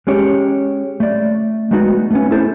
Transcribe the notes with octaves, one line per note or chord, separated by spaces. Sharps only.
G#3 C#4 G4 C#5
A3 D5
G#3 A3 B3 D#4 F#4
A3 B3 C#4
E4 A4 C5